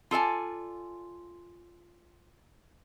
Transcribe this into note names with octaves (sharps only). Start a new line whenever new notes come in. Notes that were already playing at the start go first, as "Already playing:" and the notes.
F4 A4 D5 G#5